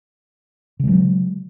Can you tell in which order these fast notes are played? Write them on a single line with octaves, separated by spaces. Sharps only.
C#3 G#3 F#3